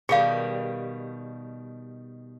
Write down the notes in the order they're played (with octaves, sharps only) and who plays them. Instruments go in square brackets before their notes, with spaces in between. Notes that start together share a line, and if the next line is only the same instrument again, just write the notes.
[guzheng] B2 D#3 G3 [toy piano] G#4 F5